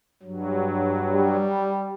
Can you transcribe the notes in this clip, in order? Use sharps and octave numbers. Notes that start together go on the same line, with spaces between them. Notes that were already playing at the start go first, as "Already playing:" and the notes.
G2 F#3
G3